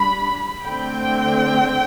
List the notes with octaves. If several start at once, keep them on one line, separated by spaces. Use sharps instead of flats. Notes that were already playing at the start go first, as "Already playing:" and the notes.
Already playing: G3 D4 B5
D3 A3 C4 G5